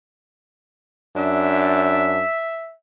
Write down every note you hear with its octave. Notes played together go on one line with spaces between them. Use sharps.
F#2 D4 E5